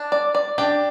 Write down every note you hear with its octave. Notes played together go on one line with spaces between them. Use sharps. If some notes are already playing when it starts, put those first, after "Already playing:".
Already playing: D4
D5
D5
D4 G4